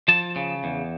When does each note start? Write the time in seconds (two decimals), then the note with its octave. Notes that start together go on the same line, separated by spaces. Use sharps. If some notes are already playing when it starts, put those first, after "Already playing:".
0.08 F3 A5
0.36 C#3
0.64 E2